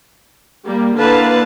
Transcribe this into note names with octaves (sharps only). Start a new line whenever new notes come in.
G3 A#3
D3 A#3 E4 B4 F5 A5